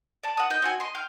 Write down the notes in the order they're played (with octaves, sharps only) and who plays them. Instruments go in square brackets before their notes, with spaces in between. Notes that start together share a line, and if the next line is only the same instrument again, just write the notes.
[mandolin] D5 A5
F#5 D#6
D#5 G5
C4 F#4 G#5
D#5 C6
G5 F6